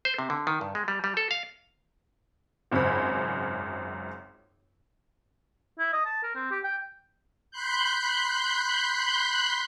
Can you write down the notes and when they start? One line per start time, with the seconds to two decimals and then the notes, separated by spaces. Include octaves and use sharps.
0.05 C5
0.18 C3
0.30 D3
0.47 D#3
0.61 G2
0.75 G#3
0.88 G3
1.04 G3
1.17 A4
1.31 F5
2.72 G#1 C#2 F#2 C5 B5
5.79 E4
5.93 D#5
6.06 A5
6.23 A#4
6.35 C4
6.51 G4
6.64 G5
7.51 B5 C6 F#6 G6